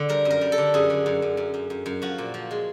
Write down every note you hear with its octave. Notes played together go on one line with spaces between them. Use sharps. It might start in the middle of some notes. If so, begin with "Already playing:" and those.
Already playing: D3
G3 A#4
F#2
A#4
G3
A4
D3
F#2 G#4
D3
F#2
F#2
F#2
F#2
F#2
F#2
F3 F#4
A#2
F3
G#3